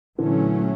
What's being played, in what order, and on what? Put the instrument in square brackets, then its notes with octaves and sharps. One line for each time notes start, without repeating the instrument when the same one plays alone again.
[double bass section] A#2 F#3 A3 C#4 [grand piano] D3 E3